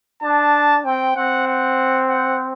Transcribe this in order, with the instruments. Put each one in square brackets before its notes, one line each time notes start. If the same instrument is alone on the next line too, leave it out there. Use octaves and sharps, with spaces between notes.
[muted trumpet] D4 [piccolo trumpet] A5
[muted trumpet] C4 [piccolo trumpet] G5
[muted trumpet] C4 [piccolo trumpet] F#5
[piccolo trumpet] F#5
F#5